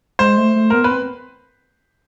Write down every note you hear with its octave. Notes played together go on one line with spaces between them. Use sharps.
G#3 C5
A3
A3
B3 A#4
B4
C4